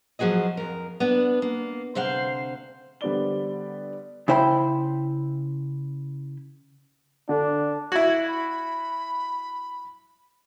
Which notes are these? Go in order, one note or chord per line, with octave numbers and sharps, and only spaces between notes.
F3 F#3 F#4 G#4 D#5
F2 A#4
B3 D4
A#3
D2 C3 C5 F5 F#5
D3 G3 B3 C5 D5 G7
C#3 E4 C5 G5 B5
D3 D4
E4 F#4 G#6
B5